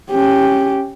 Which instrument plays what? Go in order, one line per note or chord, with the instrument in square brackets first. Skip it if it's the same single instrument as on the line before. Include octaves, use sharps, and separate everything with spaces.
[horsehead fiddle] C#4 G4